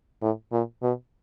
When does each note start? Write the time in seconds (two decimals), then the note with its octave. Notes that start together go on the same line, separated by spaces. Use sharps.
0.22 A2
0.52 A#2
0.82 B2